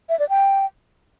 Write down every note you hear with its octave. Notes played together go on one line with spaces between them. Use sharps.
E5
D5
G5